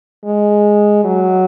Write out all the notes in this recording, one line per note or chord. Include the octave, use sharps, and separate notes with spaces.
G#3
F#3